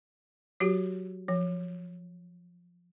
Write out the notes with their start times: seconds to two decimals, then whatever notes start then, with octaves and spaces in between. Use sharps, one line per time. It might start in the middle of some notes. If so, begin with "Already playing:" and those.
0.60 F#3 F#4 G4
1.28 F3